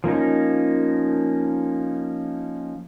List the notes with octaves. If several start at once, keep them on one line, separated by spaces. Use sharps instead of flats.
F3 A#3 C#4 D#4